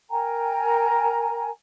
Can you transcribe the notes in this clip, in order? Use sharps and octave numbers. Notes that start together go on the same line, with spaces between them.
A#4 G5 G#5 A#5